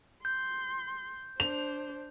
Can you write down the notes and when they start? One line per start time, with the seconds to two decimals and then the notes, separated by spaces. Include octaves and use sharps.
0.25 C6 G6
1.40 D4 C5 F7